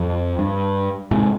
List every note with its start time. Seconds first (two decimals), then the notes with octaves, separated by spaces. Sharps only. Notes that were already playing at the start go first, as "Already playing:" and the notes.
Already playing: F2
0.39 G2
1.11 G#2 C3